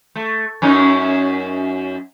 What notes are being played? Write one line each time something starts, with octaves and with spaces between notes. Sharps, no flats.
A3
F#2 C#4 D#4